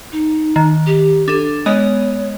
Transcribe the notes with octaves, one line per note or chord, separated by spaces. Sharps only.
D#4
D#3
G4
D4 A4
G#3 B3 C#5 D#5